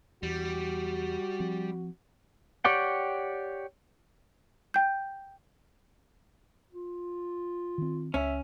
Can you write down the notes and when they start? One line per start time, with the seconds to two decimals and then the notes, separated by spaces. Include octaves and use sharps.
0.23 E2 E3 G3 F#4
1.40 F3 C4
2.65 G4 C#5 D5 F#5 G5
4.74 G5 G6
6.73 F4
7.78 D#3 C4
8.14 C#2 C#4 E5